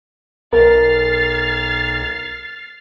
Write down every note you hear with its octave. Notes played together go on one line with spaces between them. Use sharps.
B1 A#4 F6 A6 C7